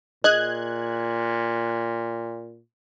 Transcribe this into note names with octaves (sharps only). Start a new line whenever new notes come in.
A#2 G#4 D#5 F#6 G#6